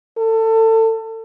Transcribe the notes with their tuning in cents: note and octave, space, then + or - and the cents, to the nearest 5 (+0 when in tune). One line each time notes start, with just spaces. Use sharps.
A4 +25